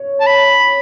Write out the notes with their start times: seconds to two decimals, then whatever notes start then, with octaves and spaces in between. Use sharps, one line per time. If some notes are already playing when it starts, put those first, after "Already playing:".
Already playing: C#5
0.20 A5
0.26 B5